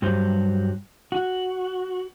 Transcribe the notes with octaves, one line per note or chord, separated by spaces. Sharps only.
G2 F#3 G3 C5
F#4